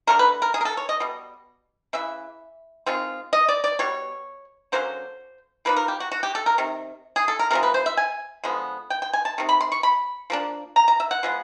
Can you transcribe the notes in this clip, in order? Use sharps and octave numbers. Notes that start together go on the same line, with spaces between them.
F#3 A3 D4 A#4
B4
A#4
G#4
A#4
A4
C#5
D#5
B2 G3
C#3 E3 E5
D#3 G#3 C4 F4
D#5
D5
D5
B2 G3 C#5
D3 F#3 A#3 C#4 C5
F3 A#3 D#4 B4
A#4
G4
F#4
F#4
G4
A4
A#4
C3 D#3
G#4
A4
A#4
C3 F3 G#3 A#4
B4
C5
E5
G#5
D3 F3 G#3 B3
G5
G5
G#5
A5
C3 D#3
B5
C6
C#6
B5
F3 A#3 D4
A#5
A#5
E5
F#5
F3 G#3 B3